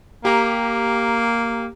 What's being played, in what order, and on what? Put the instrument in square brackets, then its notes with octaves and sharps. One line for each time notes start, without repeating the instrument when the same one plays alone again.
[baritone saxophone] A#3 [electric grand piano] G4 A#5